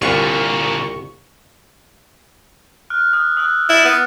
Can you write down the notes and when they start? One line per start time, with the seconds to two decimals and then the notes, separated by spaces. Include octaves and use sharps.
0.02 C2 A#2 D3 F4 B4 C#6
2.90 F6 F#6
3.13 D#6 F#6
3.37 D#6 E6 F#6
3.69 E4 A6
3.85 B3